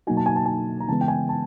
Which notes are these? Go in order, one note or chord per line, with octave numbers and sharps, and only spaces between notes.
B2 F#3 A#3 D#4 F#4 G#5
A5
G#5
A5
G#5
A#5
C#3 E3 G#3 B3 A5
G5
G#5
A5